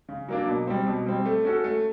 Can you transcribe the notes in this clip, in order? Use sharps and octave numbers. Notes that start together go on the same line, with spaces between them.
C#3
F#3 A#3 D4
B2
G3 C4
B2
G3 C4
A3
C#4 F#4 A4
A3